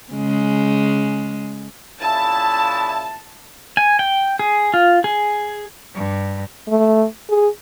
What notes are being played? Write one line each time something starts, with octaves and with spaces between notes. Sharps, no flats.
C#3 G#3
A#2 C#3 E4 A5
G#5
G5
G#4
F4
G#4
G2
A3
G#4